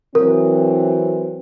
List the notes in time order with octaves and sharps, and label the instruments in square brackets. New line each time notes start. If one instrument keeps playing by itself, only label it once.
[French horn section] E3 F#3 C4 [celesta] A#4